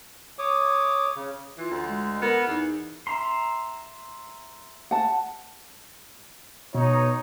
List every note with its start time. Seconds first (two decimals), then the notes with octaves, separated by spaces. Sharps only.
0.39 C#5 D6 D#6
1.16 C#3
1.58 E3 F4
1.71 D2
1.85 G#3
2.22 B3 A#4
2.47 E2 D#4
3.07 E5 A#5 C6
4.91 F#5 A5
6.74 B2 D#4 C#5